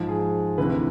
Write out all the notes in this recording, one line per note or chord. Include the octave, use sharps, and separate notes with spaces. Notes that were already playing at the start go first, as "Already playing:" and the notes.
Already playing: G#2 F3
G#4
D2 C3 E3 B4